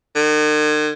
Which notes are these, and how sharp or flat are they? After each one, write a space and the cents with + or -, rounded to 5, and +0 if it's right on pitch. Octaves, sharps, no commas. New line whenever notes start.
D#3 -45